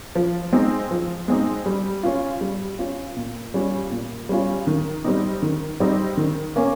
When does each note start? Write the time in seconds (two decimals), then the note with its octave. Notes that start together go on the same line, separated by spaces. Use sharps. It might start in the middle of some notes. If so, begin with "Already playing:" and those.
0.15 F3
0.52 G#3 C4 D#4
0.91 F3
1.28 G#3 C4 D#4
1.66 G3
2.03 C#4 F4
2.41 G3
2.79 C#4 F4
3.16 A#2
3.54 G3 C#4 F4
3.91 A#2
4.29 G3 C#4 F4
4.67 D#3
5.04 G3 C4 D#4
5.42 D#3
5.80 G3 C4 D#4
6.17 D#3
6.56 A#3 C#4